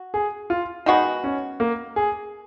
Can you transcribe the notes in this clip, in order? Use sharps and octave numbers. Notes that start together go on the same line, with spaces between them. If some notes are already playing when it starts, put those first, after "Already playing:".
Already playing: F#4
G#4
F4
D#3 G#3 B3 D#4 F#4
C#4
A#3
G#4